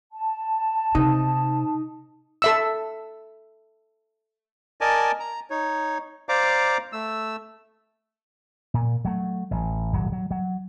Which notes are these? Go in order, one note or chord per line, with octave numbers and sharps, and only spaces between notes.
A5
C3 D#4
A4 E5 E6
A#4 D5 D#5 G#5 A5
A#5
D#4 C#5
C5 D5 F5 A#5 D6
A3 E6
A#2
F#3 A3
A1
D#1 G#1 F#3
F#3
F#3